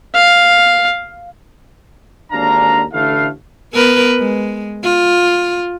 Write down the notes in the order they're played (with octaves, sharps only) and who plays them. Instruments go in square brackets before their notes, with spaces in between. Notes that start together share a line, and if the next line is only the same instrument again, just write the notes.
[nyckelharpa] F5
[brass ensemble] G#1 D#2 D3 D4 F5 A#5
A1 D3 A3 E4 F5
[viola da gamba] B3 A#4 B4
G#3
F4